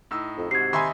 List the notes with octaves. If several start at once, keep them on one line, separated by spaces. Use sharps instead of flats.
A2 D#4 E6
F2
G#2 C3 F#4 G#6 C7
D#2 D#4 E5 G#5 B5 C6